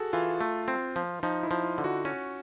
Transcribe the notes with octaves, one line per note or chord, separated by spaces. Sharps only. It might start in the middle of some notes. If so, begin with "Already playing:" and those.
Already playing: F#4 G#4 A4
E3 F4
A3
C4
F3
F3 D#4
E4
F3
F4
D3
F#4
C#4 F#4